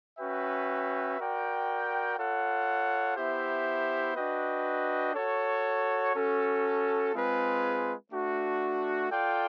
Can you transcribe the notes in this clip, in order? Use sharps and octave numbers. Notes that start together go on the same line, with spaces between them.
C#4 F#4 B4 E5 G5
F#4 A#4 D5 G5
F4 A4 C#5 F#5
B3 E4 G4 C5 E5
D4 F#4 B4 D#5 G5
F#4 A4 C#5
C#4 F#4 A4
G#3 C4 F4 G#4 B4
A3 D4 F#4
F4 A4 D5 G5